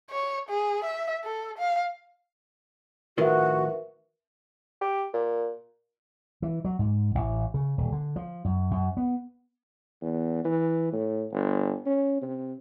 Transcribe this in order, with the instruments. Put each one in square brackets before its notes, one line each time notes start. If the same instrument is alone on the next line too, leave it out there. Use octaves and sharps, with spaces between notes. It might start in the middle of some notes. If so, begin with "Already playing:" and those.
[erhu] C#5
G#4
E5
A4
F5
[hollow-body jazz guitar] A2 D#3 F3 [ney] F#4 [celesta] A#4 B4 E5
[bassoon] G4
A#2
[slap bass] E3
F#3
G#2
A1
C#3
D#1
D3
F3
F#2
F#2
B3
[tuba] E2
E3
A2
G1
C#4
C3